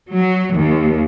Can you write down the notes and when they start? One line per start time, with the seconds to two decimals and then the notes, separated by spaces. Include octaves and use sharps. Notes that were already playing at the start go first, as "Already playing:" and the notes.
0.14 F#3
0.56 D#2